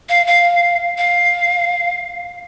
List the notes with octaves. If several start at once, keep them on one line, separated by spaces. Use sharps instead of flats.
F5
F5
F5